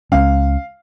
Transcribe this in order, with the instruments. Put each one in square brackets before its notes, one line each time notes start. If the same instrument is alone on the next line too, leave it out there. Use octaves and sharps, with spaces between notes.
[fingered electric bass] C#2 G#3 C#4 [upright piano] F5